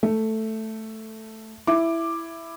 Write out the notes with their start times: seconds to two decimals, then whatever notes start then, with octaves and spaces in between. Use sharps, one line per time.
0.03 A3
1.67 E4 D6